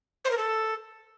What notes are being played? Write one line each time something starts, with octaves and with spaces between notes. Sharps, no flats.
C5
A#4
A4